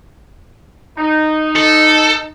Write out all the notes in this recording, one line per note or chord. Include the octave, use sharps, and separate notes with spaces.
D#4
A4